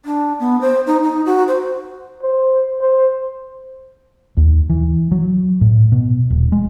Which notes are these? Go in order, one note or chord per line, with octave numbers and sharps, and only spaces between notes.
D4
B3
C5
D#4
D#4
F#4
C5
C5
C5
D#2
E3
F#3
A2
B2
D#1
G#3